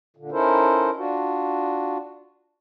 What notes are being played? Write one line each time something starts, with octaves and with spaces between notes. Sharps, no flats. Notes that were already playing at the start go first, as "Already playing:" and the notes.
A#2 D3
C#4 D#4 E4 A4 A#4 C5
D4 F4 F#4